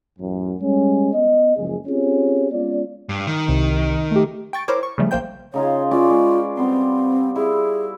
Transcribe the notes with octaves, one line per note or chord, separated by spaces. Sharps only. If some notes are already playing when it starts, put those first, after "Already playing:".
A1 F#2
G3 G#3 C#4
B3 D#5
F#1 C#2 F3 G#3 G#4
C4 C#4 F4 G4 G#4 C#5
G#3 B3 C#4 F4 D5
G2
D#3
C2 C3
A3 G4
G5 C#6 A6 D7
E4 A#4 C5 C#5 D6
C#6
C#3 F3 G3 A3
A#1 A#3 C5 G5 G6
C#3 D#4 F4 C#5
C#4 F4 B4 D5
G#3
G3 B3 C4 C6
E4 G#4